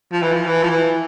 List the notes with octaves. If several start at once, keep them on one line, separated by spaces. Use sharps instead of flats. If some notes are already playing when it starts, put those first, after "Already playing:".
F3
E3
F3
E3
F3
E3